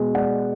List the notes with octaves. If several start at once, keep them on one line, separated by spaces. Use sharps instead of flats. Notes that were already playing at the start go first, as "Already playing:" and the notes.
Already playing: B2 G#3
G#3 D5 F#5